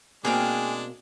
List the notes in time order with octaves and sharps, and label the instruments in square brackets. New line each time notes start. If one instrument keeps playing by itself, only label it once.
[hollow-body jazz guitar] B2 A#3 C4 [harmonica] G#3 D4 [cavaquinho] G#4 F5 G5